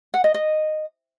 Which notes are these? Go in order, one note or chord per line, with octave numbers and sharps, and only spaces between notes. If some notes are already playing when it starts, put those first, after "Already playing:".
F#5
D#5
D#5